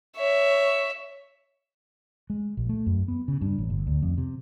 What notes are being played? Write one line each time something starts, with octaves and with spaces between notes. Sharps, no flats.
C#5 E5
G#3
A#1
A3
F#2
B3
C#3
G2
A1
G1
D2
F2
C3